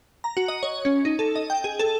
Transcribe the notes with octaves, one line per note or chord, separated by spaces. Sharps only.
A#5
F#4
D#5
C#5
C#4
D#4
A4
D#5
G5
G#4
A4